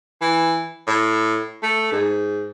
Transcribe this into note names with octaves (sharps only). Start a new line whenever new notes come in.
E3
A2
A3
G#2